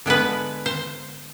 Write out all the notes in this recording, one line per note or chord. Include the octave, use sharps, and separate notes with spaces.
D3 G#3 B3 B4
C5